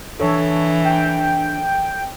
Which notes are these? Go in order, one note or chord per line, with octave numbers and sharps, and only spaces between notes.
E3 D4 A4 C#5
G5